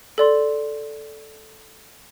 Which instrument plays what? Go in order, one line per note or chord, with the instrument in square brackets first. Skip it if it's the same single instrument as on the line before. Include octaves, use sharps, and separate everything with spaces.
[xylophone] A4 D5 C6